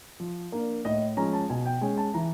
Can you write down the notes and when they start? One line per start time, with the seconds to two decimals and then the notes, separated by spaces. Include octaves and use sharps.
0.20 F3
0.52 A#3 D4
0.85 A2 D#5
1.17 F3 G#3 C#4 A#5
1.33 A5
1.50 B2 G#5
1.66 G5
1.81 G#3 C#4 G#5
1.98 A5
2.14 E3 A#5